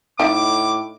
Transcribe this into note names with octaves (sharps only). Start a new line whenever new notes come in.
A2 D#4 F4 E5 D6